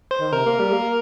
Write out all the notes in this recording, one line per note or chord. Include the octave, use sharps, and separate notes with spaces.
C5
D#3
C3 A#4
A#3
G3
A#3